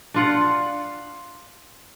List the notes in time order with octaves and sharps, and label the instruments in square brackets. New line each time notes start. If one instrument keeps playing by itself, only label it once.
[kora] D4 F4 F#5